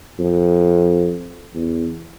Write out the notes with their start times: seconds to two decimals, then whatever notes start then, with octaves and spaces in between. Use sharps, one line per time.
0.19 F2
1.54 E2